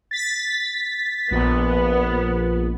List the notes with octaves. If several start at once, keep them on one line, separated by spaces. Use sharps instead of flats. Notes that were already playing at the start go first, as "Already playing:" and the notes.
A6 B6
A#1 B3